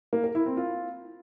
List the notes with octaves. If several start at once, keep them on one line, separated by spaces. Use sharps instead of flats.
A#3
A#4
E4
C4
F4